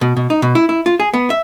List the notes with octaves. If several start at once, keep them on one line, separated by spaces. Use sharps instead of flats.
B2
B2
D#4
B2
E4
E4
F4
G#4
B3
E5